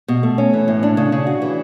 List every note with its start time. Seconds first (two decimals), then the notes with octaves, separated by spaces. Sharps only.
0.08 B2
0.23 A3
0.38 C#4
0.53 E3
0.68 A2
0.83 D4
0.97 C#3
1.12 C#3
1.27 F#4
1.42 E3